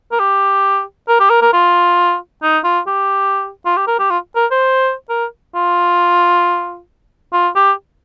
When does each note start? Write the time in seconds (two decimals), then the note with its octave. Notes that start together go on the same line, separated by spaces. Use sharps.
0.12 A#4
0.20 G4
1.08 A#4
1.20 G4
1.30 A#4
1.42 A#4
1.53 F4
2.43 D#4
2.64 F4
2.87 G4
3.65 F4
3.77 G4
3.87 A#4
3.99 G4
4.10 F4
4.36 A#4
4.51 C5
5.09 A#4
5.55 F4
7.33 F4
7.56 G4